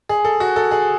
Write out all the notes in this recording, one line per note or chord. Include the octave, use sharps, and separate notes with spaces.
G#4
A4
F#4
A4
G#4